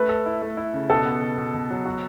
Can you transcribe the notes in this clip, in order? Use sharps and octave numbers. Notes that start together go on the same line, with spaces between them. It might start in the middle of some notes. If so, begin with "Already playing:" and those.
Already playing: A3 B4
A4
E4
A3
E4
C#3
B2 A4
B3
B2
B2
B2
F#3
F#4